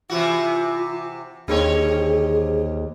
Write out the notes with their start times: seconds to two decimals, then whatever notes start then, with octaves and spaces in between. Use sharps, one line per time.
0.10 C3 E3 F4 F#4
1.48 D#2 D3 C4 G#4 C#5